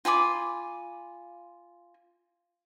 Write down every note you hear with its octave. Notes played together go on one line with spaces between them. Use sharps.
F4 G#5 B5 D6